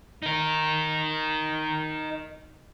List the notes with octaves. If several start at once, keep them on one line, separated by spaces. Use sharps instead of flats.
D#4 A#4